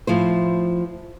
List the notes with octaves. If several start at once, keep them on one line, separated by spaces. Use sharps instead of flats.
A2 F3 E4 C5